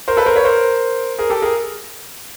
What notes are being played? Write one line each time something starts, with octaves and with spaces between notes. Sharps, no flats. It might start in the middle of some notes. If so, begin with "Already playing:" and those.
A#4 C5
A4 B4
A#4 C5
B4 C#5
A#4 C5
G#4 A#4
G4 A4
G#4 A#4